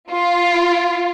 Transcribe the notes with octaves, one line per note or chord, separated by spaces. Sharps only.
F4